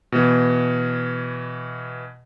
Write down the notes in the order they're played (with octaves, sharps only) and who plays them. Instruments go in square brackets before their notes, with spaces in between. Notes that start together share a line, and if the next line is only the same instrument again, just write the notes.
[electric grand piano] B2 E3